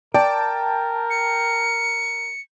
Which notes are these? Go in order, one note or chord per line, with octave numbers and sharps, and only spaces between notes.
A#4 D5 G5 A5
C#7